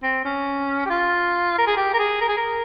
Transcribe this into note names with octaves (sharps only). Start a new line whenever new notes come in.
C4
C#4
G4
F4
A#4
G#4
G4
A#4
G#4
A#4
G#4
A#4